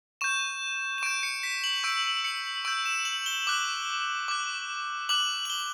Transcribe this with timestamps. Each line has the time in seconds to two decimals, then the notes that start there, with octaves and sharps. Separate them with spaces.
0.21 C#6 G6 E7
0.98 E7
1.03 C#6 G6 D7
1.23 C#7
1.43 B6
1.64 F#7
1.83 C#6 E6 G6 D7
2.25 C#7
2.65 C#6 E6 G6 D7
2.86 E7
3.05 F#7
3.26 G7
3.47 D6 F#6
4.28 D6 F#6
5.09 D6 F#6 F#7
5.45 F#7
5.50 G7